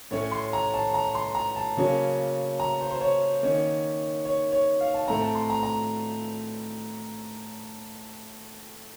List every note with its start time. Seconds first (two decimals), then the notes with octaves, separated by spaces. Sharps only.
0.11 A2 A3 C#4 C#5
0.31 C6
0.53 A#5
0.74 A5
0.94 A#5
1.15 C6
1.35 A#5
1.56 A5
1.77 C#3 F#3 A#3 C#4
2.60 A#5
2.81 C5
2.91 C5
3.01 C#5
3.43 D#3 A#3 C#4
4.25 C#5
4.52 C#5
4.81 F5
4.94 A5
5.08 A2 A3 C4 A#5
5.22 A5
5.35 C6
5.50 A#5
5.63 A#5